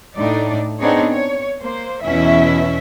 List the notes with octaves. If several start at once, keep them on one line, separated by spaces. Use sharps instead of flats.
A2 D4 D#4 D5
B3 C4 D4 D#4 G#4 C#5
C#5
A#3 C5
E2 B2 E3 C#4 E4 E5